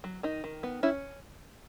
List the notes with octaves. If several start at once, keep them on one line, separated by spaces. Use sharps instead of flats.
F#3
D#3 D#4
D#3
B3
C#4 E4